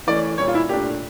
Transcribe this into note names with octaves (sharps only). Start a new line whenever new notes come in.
E3 A3 C#4 D5
A#2 G3 C#4 C#5
F4
E4
A#2 A3 D4 G4